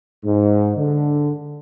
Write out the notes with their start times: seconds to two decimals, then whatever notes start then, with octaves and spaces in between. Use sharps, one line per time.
0.25 G#2
0.77 D3